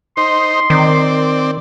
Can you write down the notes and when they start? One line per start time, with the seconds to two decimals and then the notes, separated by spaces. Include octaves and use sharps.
0.17 D#4 C5 C6
0.70 D#3 C4 D5